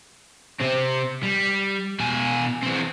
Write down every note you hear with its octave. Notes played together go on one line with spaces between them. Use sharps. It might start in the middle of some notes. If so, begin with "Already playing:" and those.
C3 C4
G3
B2 G#5
E3 C4